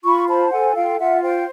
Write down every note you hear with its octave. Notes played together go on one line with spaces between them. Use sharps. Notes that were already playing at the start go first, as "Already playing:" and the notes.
F4 B5 C#6
C5 A5 B5
A4 F#5 G#5
F4 F5 G5
F4 E5 F#5
C5 F5 G5